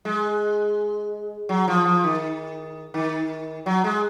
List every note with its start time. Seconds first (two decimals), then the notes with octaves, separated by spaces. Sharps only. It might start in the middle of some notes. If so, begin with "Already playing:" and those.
0.05 G#3
1.49 F#3
1.68 F3
1.85 F3
2.04 D#3
2.94 D#3
3.66 F#3
3.84 G#3